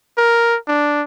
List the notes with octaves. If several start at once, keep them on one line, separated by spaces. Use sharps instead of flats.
A#4
D4